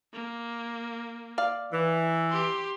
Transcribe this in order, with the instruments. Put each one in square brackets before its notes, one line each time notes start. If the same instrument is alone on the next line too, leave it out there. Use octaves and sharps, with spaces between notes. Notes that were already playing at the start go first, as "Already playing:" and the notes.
[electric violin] A#3
[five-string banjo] D5 F5
[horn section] E3
[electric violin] G4 C6